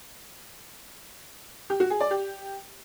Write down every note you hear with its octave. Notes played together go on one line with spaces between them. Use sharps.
G4
F#4
G#4
D5
G4